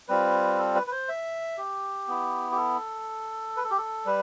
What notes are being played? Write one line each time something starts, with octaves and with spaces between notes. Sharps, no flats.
G3 C4 F4 B4
A4
B4
B4
C5
E5
G4
B3 E4
G4
A4
B4
A4
G4
A4
G3 B4